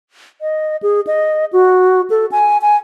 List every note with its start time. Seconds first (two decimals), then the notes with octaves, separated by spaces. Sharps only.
0.41 D#5
0.83 G#4
1.07 D#5
1.53 F#4
2.10 A4
2.32 G#5
2.62 G#5